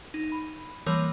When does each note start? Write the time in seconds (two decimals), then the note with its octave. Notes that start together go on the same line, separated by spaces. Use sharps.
0.14 D#4
0.32 B5
0.86 E3 G3 A#3 A#4 C#5